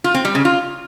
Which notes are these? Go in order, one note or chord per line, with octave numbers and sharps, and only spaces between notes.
F4
C4
G3
C#3
F4